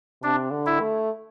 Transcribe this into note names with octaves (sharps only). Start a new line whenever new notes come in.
C3 D4
D3
E4
A3